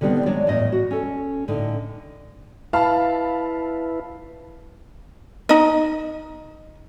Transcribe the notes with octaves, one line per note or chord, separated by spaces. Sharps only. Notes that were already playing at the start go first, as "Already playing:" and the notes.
D3 D#3 G3 B3 C4
F#3 G#3 D4 C#5 D5
E2 A2 D#5
F#4
C#4 A4
A2 D3 D#4
E4 B4 F5 A5 B5
D#4 D#5